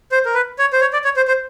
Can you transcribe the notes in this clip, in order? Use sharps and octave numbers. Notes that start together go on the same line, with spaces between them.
C5
A#4
B4
C#5
C5
C#5
D5
C#5
C5
C5